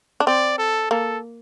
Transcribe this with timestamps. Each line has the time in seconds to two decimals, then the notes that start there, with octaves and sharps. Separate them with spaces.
0.20 D4
0.27 C4 D5
0.58 A4
0.91 A#3 A4